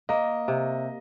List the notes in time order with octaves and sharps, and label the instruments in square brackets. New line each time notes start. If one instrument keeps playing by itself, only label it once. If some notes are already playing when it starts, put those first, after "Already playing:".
[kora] A#3 [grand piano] D#5
[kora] C3